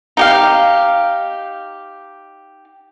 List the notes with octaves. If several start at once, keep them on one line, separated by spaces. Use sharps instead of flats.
D#4 G4 F5